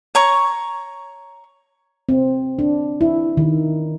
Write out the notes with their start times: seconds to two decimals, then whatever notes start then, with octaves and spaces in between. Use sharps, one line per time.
0.15 C#5 A#5 C#6
2.09 C4
2.59 D4
3.01 E4
3.37 D#3